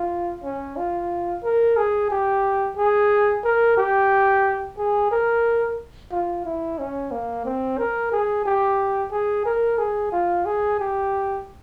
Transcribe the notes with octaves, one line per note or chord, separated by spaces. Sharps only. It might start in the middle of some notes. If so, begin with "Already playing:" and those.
Already playing: F4
C#4
F4
A#4
G#4
G4
G#4
A#4
G4
G#4
A#4
F4
E4
C#4
A#3
C4
A#4
G#4
G4
G#4
A#4
G#4
F4
G#4
G4